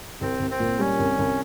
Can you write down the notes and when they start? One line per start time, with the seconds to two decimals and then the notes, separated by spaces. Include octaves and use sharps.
0.21 C2 C4
0.40 C2
0.51 C4
0.60 A#2
0.79 G3 C#4
0.99 C2
1.19 C2